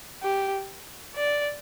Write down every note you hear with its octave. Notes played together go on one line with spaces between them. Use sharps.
G4
D5